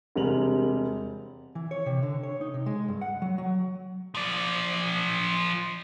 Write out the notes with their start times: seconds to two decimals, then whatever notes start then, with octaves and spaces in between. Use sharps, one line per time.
0.16 E1 C3 G3 A#4 F7 F#7
1.55 E3
1.71 C#5
1.86 C3
2.03 D3
2.23 C#5
2.41 D#4
2.54 C3
2.66 G#3
2.88 G2
3.01 F#5
3.22 F#3
3.38 F#3
4.15 F3 D5